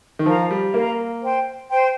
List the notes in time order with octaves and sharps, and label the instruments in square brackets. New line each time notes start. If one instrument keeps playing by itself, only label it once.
[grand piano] D#3
[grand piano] F3 [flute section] A#4 F5 A#5
[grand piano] G3
[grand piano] A#3 [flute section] A#4 F5 A#5
[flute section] C5 G5 C6
C5 G5 C6